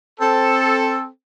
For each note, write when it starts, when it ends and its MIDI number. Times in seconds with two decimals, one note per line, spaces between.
0.20 1.06 60
0.20 1.06 69